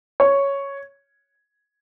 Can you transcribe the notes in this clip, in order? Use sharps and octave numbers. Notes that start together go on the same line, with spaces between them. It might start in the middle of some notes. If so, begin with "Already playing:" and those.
C#5